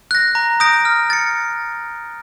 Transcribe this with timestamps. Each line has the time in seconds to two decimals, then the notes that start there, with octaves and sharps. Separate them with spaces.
0.11 F#6 A#6
0.35 A#5
0.60 D#6 G6 A#6 D7
0.85 F6
1.10 A6 C#7